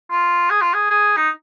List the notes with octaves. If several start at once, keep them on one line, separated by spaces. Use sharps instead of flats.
F4
G#4
F4
G#4
G#4
D#4